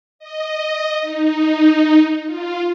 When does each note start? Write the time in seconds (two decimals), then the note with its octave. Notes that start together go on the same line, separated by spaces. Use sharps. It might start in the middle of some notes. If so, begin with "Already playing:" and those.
0.19 D#5
1.01 D#4
2.26 F4